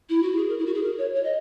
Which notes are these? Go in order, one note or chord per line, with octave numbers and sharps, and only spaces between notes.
E4
F#4
G#4
A#4
E4
F#4
G#4
A#4
C#5
C#5
D#5